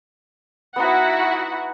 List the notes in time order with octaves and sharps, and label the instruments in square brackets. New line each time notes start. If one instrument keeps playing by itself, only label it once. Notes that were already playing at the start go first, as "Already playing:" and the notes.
[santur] B3 D#4 [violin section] E4 F#4 F#5